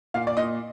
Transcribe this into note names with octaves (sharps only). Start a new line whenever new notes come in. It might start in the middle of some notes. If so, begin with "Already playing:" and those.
A#2 F5
D5
A#2 D#5